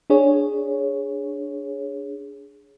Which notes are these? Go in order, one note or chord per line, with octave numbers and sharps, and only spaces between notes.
D4 G#4 C#5